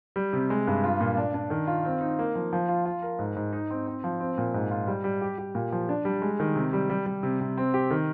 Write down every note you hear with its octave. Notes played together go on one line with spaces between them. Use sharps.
G3
C3
G#3
G2
F4
A#2
D4
D4
D#3
F4
C4
D#4
A#3
F3
F3
F4
F4
A#4
G#2
G#2
D#4
C4
C4
F3
C4
A#2
G#2
F4
G3
G3
G4
G4
A#2
F3
D4
G3
G#3
D#3
C3
G3
G3
G3
C3
C3
C4
G4
D#3